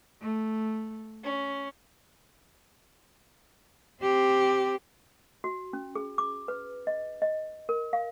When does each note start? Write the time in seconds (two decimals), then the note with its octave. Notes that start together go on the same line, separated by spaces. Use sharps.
0.21 A3
1.24 C#4
4.02 C4 G4
5.44 F#4
5.73 C#4
5.95 G#4
6.18 D6
6.48 B4
6.87 D#5
7.22 D#5
7.69 A#4
7.93 F5